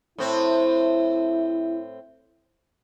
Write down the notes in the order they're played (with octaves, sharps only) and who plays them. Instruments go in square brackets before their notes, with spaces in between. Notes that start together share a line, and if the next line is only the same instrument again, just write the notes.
[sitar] A2 C4 [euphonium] E4